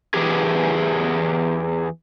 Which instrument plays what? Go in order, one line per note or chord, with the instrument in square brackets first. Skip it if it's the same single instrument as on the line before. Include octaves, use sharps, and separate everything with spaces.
[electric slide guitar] E2 E3 G4 G#4